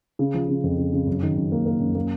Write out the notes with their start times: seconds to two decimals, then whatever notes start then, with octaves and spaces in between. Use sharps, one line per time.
0.19 C#3
0.34 F3
0.49 C#3
0.64 F2
0.78 C#3
0.93 C#3
1.07 F#2
1.22 D#3
1.37 F#2
1.52 A#3
1.66 A#3
1.80 F#2
1.95 A#3